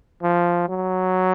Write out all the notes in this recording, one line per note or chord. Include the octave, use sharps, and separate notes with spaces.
F3
F#3